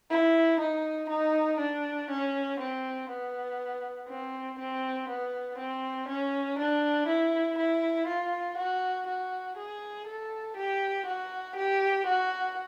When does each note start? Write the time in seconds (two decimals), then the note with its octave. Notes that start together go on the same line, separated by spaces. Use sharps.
0.10 E4
0.60 D#4
1.09 D#4
1.59 D4
2.10 C#4
2.60 C4
3.10 B3
4.09 C4
4.59 C4
5.09 B3
5.58 C4
6.08 C#4
6.59 D4
7.08 E4
7.58 E4
8.08 F4
8.58 F#4
9.07 F#4
9.57 G#4
10.07 A4
10.57 G4
11.06 F#4
11.56 G4
12.07 F#4